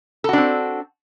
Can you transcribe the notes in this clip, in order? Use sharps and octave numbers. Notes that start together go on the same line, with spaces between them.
C4 D4 F#4 A4